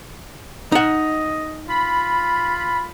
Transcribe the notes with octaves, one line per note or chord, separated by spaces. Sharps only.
D#4 D#5 F#5
F4 B5